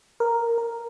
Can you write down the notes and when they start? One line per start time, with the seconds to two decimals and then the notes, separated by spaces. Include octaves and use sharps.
0.20 A#4
0.58 A#4